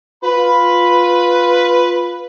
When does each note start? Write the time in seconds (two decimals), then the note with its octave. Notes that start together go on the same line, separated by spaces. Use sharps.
0.24 F4 B4 B5